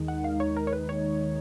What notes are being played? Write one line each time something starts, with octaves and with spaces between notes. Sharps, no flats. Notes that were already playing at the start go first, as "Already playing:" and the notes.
Already playing: D#2 D#3 G#3 D#4
F#5
F5
C#5
A#4
C#5
B4
C#5